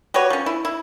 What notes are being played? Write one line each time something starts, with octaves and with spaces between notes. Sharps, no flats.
F#4 G4 B4 C#5
F3 C#4
E4
E4